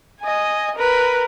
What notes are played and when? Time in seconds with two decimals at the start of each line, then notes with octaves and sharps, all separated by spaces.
0.21 D#5 G#5
0.76 A#4 B4